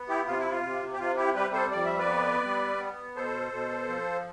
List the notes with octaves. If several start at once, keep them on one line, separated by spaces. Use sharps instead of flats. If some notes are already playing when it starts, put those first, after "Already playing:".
Already playing: B3
E4 G4
C3 F4
E4
F4
C3
G4
C3 F4
E4 G4
G3 G4 B4
A4 C5
F2 D5
E5
B4 D5
B3
G3
B3
B2 A4 C5
B2
F3